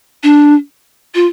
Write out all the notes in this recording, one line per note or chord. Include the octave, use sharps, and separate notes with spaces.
D4
F4